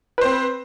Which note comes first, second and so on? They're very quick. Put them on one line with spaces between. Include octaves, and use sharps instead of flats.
B4 C5 C4